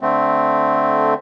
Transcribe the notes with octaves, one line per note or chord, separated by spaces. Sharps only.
D3 A3 C4